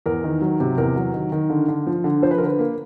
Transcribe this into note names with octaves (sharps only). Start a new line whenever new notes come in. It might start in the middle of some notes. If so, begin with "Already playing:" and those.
E2 A#4
D#3
F#3
C3
E2 A#4
F#3
D#3
D#3
D3
D3
F3
D3
F3 C5
B4
D3 A#4
B4
A#3